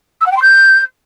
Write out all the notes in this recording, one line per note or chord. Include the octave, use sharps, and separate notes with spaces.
E6
F#5
G5
C6
G6